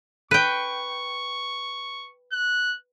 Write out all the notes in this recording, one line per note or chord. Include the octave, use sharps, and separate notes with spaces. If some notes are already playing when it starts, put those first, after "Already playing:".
B4 G5 C#6
F#6